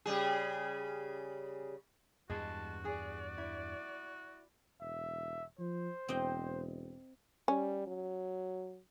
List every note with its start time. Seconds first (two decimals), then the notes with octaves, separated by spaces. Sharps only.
0.05 C#3 G3 G#4
2.30 E2 G2 G#3 F#4 A5
2.85 G#4 D5
3.38 E4
4.81 E1 E5
5.59 F3 C5
6.08 E1 C4 D#5 G5
7.48 G3 C#4
7.87 F#3